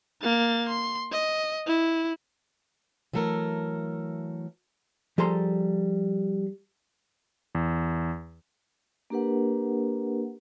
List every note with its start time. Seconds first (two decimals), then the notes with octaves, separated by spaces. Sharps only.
0.23 A#3 A6
0.69 C6
1.12 D#5
1.67 E4
3.13 E3 F#3 A3 A4 A#4
5.18 F3 G3 G#4 A4 A#5 C6
7.55 E2
9.10 A#3 D4 G4 A#4 B4 F#5